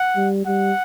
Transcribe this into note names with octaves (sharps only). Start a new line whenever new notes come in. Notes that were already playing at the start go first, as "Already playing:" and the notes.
Already playing: F#5
G3
G3 F#5